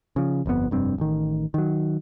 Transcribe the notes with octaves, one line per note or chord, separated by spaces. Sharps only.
C#3 F3
G1 F2 A2 B3
F1 G2 C4
A1 D#3
D#3 F#3